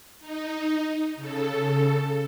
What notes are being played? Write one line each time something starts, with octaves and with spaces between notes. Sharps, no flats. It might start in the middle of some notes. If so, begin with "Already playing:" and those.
D#4
C#3 A4